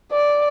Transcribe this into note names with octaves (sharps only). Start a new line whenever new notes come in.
D5